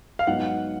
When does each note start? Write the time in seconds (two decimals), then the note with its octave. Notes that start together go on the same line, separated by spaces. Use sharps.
0.19 F5
0.27 G#2 F#3 B3 D#4 F#5